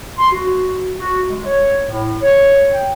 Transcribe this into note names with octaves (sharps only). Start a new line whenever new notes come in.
C6
F#4
F#4
G#3
C#5
A2
C#5
G5